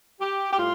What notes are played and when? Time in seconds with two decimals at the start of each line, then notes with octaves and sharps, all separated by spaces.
0.21 G4
0.52 G4
0.59 A2 G3 F4